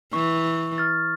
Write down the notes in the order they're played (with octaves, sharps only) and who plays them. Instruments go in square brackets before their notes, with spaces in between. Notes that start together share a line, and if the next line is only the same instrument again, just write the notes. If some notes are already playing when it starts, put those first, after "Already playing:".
[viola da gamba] E3 [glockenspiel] C#6
[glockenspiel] F6 A6